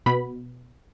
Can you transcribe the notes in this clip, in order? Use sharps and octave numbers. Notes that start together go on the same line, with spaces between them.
B2 B3 B5